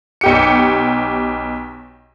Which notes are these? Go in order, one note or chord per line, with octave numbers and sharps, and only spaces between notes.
B1 G4 C#7